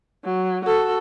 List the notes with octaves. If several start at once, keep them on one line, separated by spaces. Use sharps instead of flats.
F#3
F#4 A4